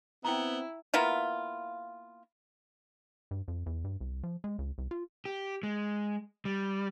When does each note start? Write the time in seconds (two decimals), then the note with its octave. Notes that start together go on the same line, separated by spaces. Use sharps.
0.24 B3 C4 E4 G5 A#5
0.94 A#3 B3 E4 F4
3.31 G2
3.48 F2
3.66 E2
3.84 G2
4.01 C2
4.23 F3
4.44 G#3
4.59 C#2
4.78 C2
4.91 F4
5.25 G4
5.63 G#3
6.45 G3